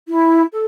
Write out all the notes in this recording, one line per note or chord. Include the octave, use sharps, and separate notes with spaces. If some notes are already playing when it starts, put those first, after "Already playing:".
E4
A4